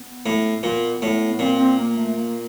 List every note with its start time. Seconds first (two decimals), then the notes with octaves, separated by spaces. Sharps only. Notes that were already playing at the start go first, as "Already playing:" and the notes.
Already playing: B3
0.26 A2
0.63 A#2 B3
1.02 A2
1.32 B3
1.39 A#2 C4
1.58 C4
1.78 A#3
1.97 A3
2.16 A#3